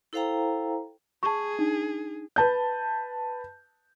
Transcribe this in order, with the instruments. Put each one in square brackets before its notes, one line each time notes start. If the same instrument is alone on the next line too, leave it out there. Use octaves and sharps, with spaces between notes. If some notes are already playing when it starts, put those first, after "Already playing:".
[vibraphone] E4 A4 C5 F5 G5 A#5
[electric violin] G#4 [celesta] A5 C#6
[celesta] D4 D#4
[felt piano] B4 A5 G6